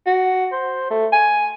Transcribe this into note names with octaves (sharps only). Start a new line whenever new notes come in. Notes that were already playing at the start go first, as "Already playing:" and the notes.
F#4
C5
A3
G#5